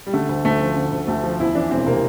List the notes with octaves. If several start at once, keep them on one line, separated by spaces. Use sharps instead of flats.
G3
D3 A3
D2
D2 A3
F3
D3
D2
D2 A3
F3
E2 E4
E3 D4
E1 C4
C3 A#3